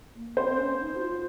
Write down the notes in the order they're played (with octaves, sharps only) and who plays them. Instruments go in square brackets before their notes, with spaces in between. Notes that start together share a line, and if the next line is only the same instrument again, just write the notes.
[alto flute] A#3
[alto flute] C4 [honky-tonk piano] C5
[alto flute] C4
C#4
D#4
F#4
F4